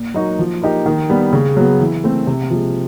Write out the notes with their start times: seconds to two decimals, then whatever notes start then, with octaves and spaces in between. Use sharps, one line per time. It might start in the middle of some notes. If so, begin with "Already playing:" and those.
Already playing: A#2
0.14 F#3 A#3 D#4 F#4
0.39 F3
0.62 A#3 D#4 G4
0.86 D#3
1.10 G3 B3
1.33 C#3
1.57 F#3 B3
1.80 E3
2.04 A3 C4
2.27 C3
2.50 F3 G#3